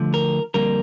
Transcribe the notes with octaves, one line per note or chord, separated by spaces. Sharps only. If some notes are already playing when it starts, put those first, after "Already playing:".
Already playing: D2 D3 F3
A#4
F2 D3 G3 A#3 A#4